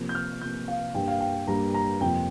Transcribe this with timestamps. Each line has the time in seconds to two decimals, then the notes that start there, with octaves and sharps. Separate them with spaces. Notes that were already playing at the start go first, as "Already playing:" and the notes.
Already playing: C3 F3 A#3
0.09 G6
0.15 F6
0.42 C3 F3 A#3 G6
0.68 F5
0.95 G2 G3 A#3 G5
1.08 F5
1.20 G5
1.48 G2 G3 A#3 A#5
1.74 A#5
2.01 F2 C3 F3 A#3 G5